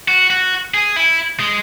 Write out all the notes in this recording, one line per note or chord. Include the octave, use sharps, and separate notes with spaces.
F#4
F#4
G#4
E4
G#3